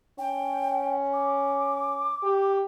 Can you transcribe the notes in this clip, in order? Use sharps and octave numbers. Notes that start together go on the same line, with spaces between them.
C#4 G5
D6
G4